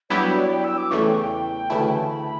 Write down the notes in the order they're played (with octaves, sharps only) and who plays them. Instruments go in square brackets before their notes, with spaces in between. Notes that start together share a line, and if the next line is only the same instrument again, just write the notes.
[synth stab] G2 F#3 B3 E4 G4 [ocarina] C#5
[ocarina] C#5
D5
G5
E6
D6
[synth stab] E2 C#3 E3 A3 [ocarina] C#6
[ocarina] G5
G5
[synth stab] D2 C#3 E3 A3 E4 [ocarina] A5
[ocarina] G5
A5
B5